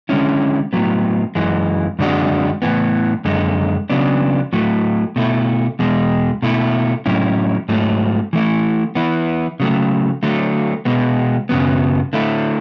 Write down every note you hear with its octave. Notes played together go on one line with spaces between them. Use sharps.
D3 G#3 C#4 E4
A2 F#3 B3
F#2 E3 G#3
F#2 D3 G#3 D4 F#4
A2 E3 B3
F#2 D3 G#3
C#3 F#3 B3 D4
A2 F#3 A3
B2 A3 E4
E2 B2 G#3
B2 A3 E4
A2 F#3 C#4 E4
G#2 F#3 A3
E3 A3 E4
E3 B3 E4
C#3 F#3 A3
D3 F#3 A3
B2 G#3 B3
F#2 C#3 F#3 B3
D3 A3 E4